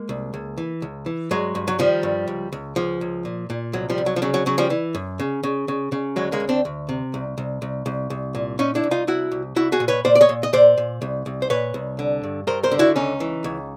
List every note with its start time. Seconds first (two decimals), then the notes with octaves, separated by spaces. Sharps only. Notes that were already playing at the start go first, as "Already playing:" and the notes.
Already playing: G#3 A#3
0.09 C2
0.34 C#2
0.58 E3
0.82 C#2
1.06 E3
1.31 G2 F#3 G#3
1.55 G2
1.68 F#3
1.79 D#3 F3 G3
2.03 G2
2.28 C#2
2.52 C#2
2.76 C#2 F3
3.01 C#2
3.25 A#2
3.50 A#2
3.73 C2 F#3
3.90 F3 G3
3.98 C2
4.06 F#3
4.16 F3
4.22 C#3 F#3
4.34 F#3
4.46 C#3 F#3
4.58 F3 G3
4.70 E3
4.95 F#2
5.19 C#3
5.43 C#3
5.68 C#3
5.92 C#3
6.16 D2 F#3 G#3
6.32 G#3 A#3
6.40 D2
6.49 C4 D4
6.65 D2
6.89 C3
7.14 C2
7.38 C2
7.62 C2
7.86 C2
8.10 C2
8.35 A#2
8.59 A#2 C#4 D#4
8.75 D4 E4
8.84 C2
8.91 D#4 F4
9.07 C2 E4 F#4
9.31 C2
9.56 C2 E4 F#4
9.72 F#4 G#4
9.80 A#2
9.88 B4 C#5
10.05 A#2 C5 D5
10.15 D5
10.21 C#5 D#5
10.29 A#2
10.43 D#5
10.53 A#2 C5 D5
10.78 A#2
11.02 C2
11.26 C2
11.42 C5
11.50 A#2 B4 C#5
11.74 C2
11.99 D3
12.24 G2
12.47 G2 A#4 C5
12.63 A#4 C5
12.72 D3
12.79 E4 F#4
12.96 C#2 C#4 D#4
13.20 E3
13.44 C#2